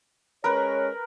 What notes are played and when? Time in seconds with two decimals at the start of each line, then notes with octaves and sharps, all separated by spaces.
0.44 G#3 C#4 A#4 B4 C#5